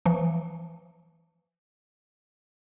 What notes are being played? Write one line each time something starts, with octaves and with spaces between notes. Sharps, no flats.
E3 F3